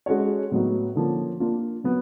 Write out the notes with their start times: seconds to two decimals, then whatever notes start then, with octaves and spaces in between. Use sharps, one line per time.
0.06 G#3 C#4 F#4 A4 C#5
0.51 A2 F#3 B3 D#4 F#4
0.95 D3 F3 A#3 C#4
1.40 A#3 D4 F4
1.84 F#3 B3